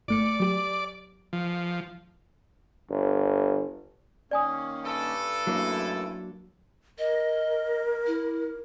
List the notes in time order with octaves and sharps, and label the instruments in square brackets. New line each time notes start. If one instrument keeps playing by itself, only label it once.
[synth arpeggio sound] G1 A3 C#7 [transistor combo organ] D5
[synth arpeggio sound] F#3 G4
[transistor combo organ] F3
[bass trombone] G1
[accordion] D#3 A#3 C#4 [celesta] D5 G#5 D#6
[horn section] G2 A4
[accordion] F#2 A2 E4 [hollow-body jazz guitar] F#3 A#3 D4
[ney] A#4 [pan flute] D#5
[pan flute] E4